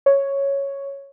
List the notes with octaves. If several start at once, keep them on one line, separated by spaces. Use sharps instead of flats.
C#5